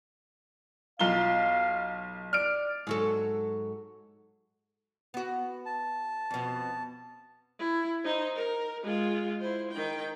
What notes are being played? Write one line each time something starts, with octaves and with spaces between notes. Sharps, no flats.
B1 F4 F5 G7
D5 F6 D7
G#2 F#3 A4
B3 F#4
A5
F2 B2
E4
D#4 C5
A#4
G#3 F4
E4 C5
D#3 G5